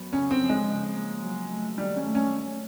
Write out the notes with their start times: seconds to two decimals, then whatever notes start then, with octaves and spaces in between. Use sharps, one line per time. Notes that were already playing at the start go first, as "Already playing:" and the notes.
Already playing: F#2 F#3 B3
0.13 C#3 C#4
0.31 C4
0.40 F3
0.49 G#3
0.68 C#3
0.95 A#3
1.23 F#3
1.50 A3
1.78 D#3 G3
1.96 C#4
2.05 A3
2.15 C#4